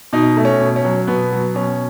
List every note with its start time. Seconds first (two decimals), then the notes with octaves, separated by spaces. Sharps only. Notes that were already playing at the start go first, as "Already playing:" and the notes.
0.13 B2 D#4
0.37 A3
0.45 C#4
0.60 B2
0.76 C#4
0.84 F#3
1.07 B2 B3
1.32 F#3
1.55 B2 C#4